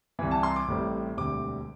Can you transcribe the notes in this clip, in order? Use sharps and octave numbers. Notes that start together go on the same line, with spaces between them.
C2 C3 E3
A5
C6
D6
A1 A2 G3 C4
E1 D2 C3 G3 C4 D6